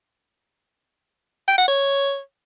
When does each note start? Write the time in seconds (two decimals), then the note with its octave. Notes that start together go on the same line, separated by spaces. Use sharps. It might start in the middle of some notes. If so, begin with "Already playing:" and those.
1.48 G5
1.58 F#5
1.68 C#5